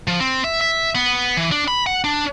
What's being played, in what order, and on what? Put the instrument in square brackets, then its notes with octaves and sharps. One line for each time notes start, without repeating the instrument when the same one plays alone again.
[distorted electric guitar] F3
C4
E5
E5
B3
E3
D4
B5
F#5
D4